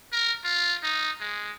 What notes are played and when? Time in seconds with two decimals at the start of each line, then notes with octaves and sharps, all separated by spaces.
0.12 A#4
0.44 F4
0.83 D#4
1.21 G#3